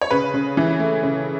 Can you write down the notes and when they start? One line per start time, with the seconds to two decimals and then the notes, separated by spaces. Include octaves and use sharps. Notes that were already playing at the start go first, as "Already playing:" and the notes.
0.01 C#5
0.11 C#3 B4
0.34 C#3
0.57 E3
0.80 A3
1.03 C#3